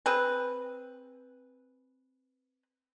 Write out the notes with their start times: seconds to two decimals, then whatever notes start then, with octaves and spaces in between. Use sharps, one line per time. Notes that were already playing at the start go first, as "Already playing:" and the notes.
0.06 C4 G#4 B4